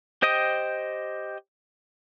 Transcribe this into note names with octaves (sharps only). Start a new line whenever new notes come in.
G4 C5 D#5 G5 D#6